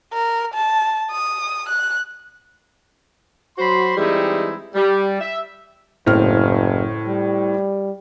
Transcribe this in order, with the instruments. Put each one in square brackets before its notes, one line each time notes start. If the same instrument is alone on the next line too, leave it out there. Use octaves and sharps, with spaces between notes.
[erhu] A#4
A5
D#6
F#6
[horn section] F#3 F#4 C5 B5 C6
E3 G3 G#3 C4 D#4 E4
G3
E5
[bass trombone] F#1 [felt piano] A2 C4 F6
[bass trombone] G3